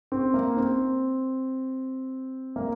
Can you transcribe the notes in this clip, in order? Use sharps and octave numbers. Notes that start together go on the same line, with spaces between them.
C4
A#3
C4
A#3